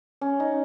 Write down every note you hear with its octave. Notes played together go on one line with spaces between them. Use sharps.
C#4
D#4